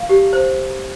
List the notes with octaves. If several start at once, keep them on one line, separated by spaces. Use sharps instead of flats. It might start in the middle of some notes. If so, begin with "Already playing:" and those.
Already playing: F5
G4
C5